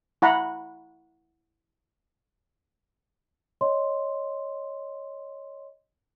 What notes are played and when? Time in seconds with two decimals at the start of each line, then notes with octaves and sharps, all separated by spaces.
0.22 E4 F#5 A#5 B5
3.61 C#5 D#5 C6